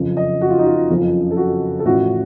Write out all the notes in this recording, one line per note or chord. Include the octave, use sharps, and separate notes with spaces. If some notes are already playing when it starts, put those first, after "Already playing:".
Already playing: F#1 F2 C#3 F3
D#5
F#4
F4
D#4
F4
F#1 F2 C#3 F3
A4
F#4
A4
A1 A2 F3 F#4